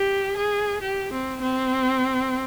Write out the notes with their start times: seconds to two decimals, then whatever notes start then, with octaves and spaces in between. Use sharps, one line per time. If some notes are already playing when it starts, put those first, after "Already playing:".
Already playing: G4
0.37 G#4
0.81 G4
1.12 C4
1.42 C4